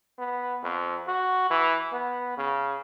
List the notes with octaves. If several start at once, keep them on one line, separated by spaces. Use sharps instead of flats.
B3
F2
F#4
E3
B3
C#3